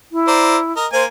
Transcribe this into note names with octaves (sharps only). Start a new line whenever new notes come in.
E4
C5 D5 A#5
A#4 D#5
A#3 C5 G#5